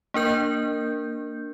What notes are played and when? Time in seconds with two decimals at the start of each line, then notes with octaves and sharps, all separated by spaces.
0.14 A#3 D4 A#4 G6